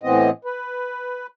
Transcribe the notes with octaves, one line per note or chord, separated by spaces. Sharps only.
A2 E3 B3 C4 D#5
B4